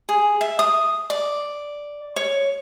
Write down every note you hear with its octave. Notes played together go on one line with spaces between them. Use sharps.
G#4
E5
D#6
D5
C#5